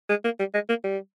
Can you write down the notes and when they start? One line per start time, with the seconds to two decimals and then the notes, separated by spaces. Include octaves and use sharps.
0.09 G#3
0.24 A#3
0.39 G3
0.54 G#3
0.69 A#3
0.84 G3